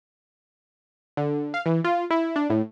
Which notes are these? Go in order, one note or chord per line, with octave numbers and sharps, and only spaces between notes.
D3
F5
E3
F4
E4
D4
A2